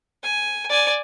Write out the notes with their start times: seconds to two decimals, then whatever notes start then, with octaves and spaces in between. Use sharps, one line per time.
0.23 G#5
0.69 D5 G#5